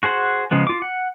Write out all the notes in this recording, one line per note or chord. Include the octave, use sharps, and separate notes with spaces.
F#4 G#4 C5 F#5
C#3 F3 G#3 B3
F4 D6
F#5